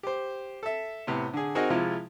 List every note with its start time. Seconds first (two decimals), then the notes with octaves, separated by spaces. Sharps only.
0.03 G4 C5
0.63 A4 E5
1.07 A2 C3 B3
1.33 D3 G#4
1.55 C4 D#4 F#4 G#4 A#4 D#5
1.70 C3 F3 G#3 E4 F4